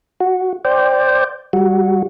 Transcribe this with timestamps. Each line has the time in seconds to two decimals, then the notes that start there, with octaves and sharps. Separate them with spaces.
0.20 F#4
0.65 C5 D5 G5
1.53 G3 F#4